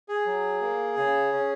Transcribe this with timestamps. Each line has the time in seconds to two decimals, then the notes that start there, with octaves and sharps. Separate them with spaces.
0.09 G#4
0.26 F#3
0.61 A#3
0.96 C#3
1.32 C#4